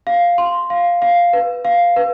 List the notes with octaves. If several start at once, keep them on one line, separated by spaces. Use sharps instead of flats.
F5
C6
F5
F5
B4
F5
B4